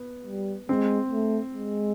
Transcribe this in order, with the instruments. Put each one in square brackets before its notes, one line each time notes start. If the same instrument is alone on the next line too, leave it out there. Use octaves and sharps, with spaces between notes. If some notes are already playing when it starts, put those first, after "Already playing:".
Already playing: [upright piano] B3
[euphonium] G3
[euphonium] G#3 [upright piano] C4
[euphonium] A3
G#3